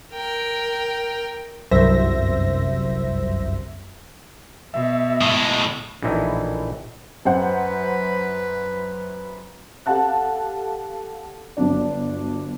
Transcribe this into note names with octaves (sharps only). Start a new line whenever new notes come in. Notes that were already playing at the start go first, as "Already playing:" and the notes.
A#4 G5
G1 C2 F#2 C5 E5 A#6
B2 E5
A2 G#3
A#1 A2 E3 D#4 E4
F#2 B4 C5 F#5
G4 A4 F5 F#5 A5 F#6
G1 F#3 D4 D5